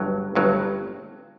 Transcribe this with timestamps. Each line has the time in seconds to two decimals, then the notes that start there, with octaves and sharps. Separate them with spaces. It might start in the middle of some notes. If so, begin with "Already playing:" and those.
Already playing: G1 G2 F#3
0.35 G1 G2 F#3